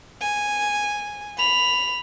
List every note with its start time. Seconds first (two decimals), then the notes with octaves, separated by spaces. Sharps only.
0.21 G#5
1.38 B5 F7